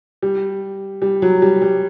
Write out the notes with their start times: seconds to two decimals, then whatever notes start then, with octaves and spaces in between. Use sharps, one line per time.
0.23 G3
1.02 G3
1.22 F#3
1.42 G3
1.62 G3